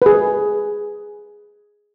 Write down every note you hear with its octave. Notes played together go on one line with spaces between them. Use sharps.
G#4 B4